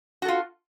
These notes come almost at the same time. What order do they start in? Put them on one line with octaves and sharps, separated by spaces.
F#4 A4 F4